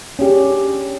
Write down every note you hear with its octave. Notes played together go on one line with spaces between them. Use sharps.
C#4 D4 G4 G#4